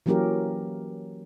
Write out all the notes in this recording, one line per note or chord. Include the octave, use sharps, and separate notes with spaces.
E3 F#3 A#3 C#4 G4 A#4